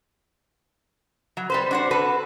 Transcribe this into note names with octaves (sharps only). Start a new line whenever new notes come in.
F#3
G3 B4 C5
D4 F#4 C5
F#4 A4 B4